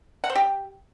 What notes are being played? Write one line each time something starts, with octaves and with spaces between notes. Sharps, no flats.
F#5
C5
G4